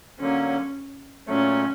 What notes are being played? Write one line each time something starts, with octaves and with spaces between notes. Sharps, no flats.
D3 F#3 A#3 C#4
A#2 F#3 A3 C#4